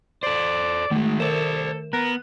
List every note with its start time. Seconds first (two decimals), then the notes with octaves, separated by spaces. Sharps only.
0.23 A4 C5 D5
0.91 D#3 G#3 A3
1.20 D#3 A4 A#4 C5 D5 E7
1.93 B3 A#4 F#6